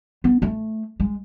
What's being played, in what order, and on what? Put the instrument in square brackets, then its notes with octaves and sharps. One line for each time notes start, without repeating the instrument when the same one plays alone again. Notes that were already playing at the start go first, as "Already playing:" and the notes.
[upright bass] B3
A3
G#3